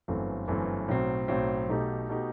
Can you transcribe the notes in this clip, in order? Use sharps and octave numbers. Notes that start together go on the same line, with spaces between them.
G1 F#2 E3 A3 C4
G1 F#2 E3 A3 C4
B1 A2 F#3 C4
B1 A2 F#3 C4
B1 B2 A3 D#4 G4
B2 A3 D#4 G4